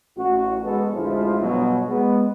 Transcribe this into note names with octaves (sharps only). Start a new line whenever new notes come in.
A1 F#4
G#3 B3 A4
A1 D2 F3 G#3 E4 F4
G2 B2 F#3
G#3 B3